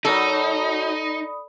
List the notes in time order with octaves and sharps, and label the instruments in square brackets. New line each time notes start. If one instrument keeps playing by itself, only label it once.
[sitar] F#3 A#4 [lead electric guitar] D#4 [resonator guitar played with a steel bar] A4 [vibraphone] D5 B5 D#6